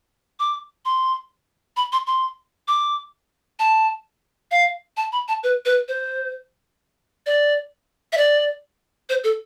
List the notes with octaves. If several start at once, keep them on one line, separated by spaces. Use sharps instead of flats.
D6
C6
B5
C6
C6
D6
A5
F5
A5
B5
A5
B4
B4
C5
D5
E5
D5
C5
A4